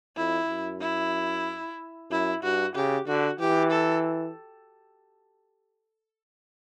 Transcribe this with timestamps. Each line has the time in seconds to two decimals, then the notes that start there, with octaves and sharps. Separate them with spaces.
0.16 F2 E4
0.49 F#2
0.81 E4
2.10 F#2 E4
2.43 G2 F#4
2.75 C#3 G4
3.07 D3 F#4
3.39 E3 G4
3.71 A4